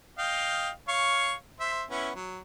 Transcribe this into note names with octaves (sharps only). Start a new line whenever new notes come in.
D#5 F5 G5
C#5 F5 C#6
C5 E5
B3 C#4 E4
F#3